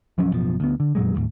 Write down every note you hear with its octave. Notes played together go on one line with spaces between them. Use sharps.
D1 F3 F#3 C#4
A1 F#2 B2 F3
D2 B3
D3
F2 A#2 F#3 G#3
A1 D#2 A2